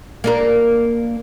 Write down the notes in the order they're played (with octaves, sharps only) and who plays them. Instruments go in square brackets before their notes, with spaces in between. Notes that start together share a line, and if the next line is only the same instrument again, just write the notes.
[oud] A#3 D4 A#4